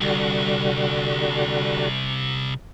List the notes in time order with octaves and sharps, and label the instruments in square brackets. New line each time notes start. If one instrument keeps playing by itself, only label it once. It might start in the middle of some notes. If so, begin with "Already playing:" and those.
[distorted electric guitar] C2 [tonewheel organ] D3 G3 F#4